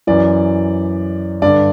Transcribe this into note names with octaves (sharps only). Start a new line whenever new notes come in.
F#2 E3 D5
G2 D3 D5